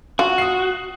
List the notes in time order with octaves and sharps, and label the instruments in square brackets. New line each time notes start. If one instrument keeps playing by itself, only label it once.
[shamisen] F4 [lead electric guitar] F#4 [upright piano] F#5
[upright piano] D#6 C7